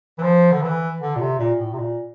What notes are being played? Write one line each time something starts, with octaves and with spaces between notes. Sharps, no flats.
E3
F3
D3
E3
D3
A#2
C3
A#2
A2
C3
A#2